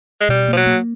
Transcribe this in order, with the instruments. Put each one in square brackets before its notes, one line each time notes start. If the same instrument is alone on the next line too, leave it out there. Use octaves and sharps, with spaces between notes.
[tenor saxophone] G#3
[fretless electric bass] B2 [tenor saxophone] G3
[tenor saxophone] F3 [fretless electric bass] A#3
[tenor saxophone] F#3
[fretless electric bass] A#3